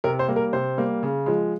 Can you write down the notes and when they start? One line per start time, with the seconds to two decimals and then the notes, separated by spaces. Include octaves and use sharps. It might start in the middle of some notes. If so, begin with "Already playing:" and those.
0.04 C3 A#4
0.19 C5
0.28 G3 A#3
0.36 A#4
0.53 C3 C5
0.78 G3 A#3
1.03 C#3
1.26 F3 G#3